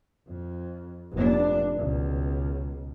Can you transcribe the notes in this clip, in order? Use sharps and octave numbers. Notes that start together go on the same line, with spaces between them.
F2
F1 D4
C#2 B2